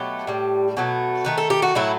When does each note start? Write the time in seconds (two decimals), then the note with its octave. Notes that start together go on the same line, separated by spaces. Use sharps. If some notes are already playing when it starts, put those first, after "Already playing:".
Already playing: B2 F#3 A3 G4
0.27 A2 G3
0.77 B2 F#3 A3
1.25 D#3 A3 B4
1.38 A4
1.50 G4
1.62 F#4
1.75 A2 F#3 A3 E4